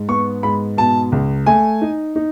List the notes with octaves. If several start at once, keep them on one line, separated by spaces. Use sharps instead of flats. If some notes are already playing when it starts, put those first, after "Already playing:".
Already playing: G#2
B3 C#6
G#2 B5
B2 A5
C#2
A3 G#5
D#4
D#4